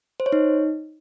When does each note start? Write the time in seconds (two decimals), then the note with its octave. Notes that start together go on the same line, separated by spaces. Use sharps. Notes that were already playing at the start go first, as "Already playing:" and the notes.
0.20 C5
0.26 C#5
0.32 D#4